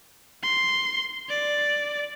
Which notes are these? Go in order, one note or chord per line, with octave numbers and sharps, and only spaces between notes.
C6
D5